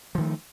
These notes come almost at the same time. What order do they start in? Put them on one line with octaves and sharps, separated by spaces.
F3 D#3 A3